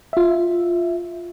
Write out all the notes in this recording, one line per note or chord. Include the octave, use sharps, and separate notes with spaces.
F4 E5